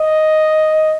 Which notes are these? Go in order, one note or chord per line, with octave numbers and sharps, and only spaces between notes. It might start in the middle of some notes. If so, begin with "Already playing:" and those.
Already playing: D#5